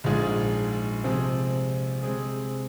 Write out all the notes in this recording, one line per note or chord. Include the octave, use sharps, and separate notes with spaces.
A#1 G#2 G#3 F4 G#4
C3 F3 G#3 C4 G#4
C3 G#3 C4 G#4